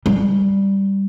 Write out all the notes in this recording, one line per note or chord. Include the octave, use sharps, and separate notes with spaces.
G3